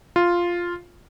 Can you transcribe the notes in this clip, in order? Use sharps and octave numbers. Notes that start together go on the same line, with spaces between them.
F4